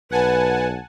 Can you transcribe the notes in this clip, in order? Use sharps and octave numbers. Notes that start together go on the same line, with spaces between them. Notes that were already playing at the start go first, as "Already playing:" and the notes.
B1 B4 F#5 G#5 A5